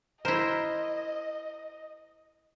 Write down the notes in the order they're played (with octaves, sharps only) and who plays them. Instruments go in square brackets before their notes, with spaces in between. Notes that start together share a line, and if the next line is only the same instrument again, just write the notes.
[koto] E4 C5 [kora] A#4 [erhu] D#5